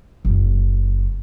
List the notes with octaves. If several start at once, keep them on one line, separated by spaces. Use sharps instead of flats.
F#1